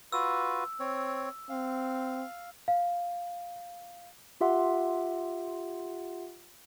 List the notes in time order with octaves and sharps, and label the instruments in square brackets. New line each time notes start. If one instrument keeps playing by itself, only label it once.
[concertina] F4 F#4 B4 [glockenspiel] E6
[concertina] C4 C#5
[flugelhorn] C4 [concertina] F5
[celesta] F5
[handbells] F4 G4 E5 F#5 C6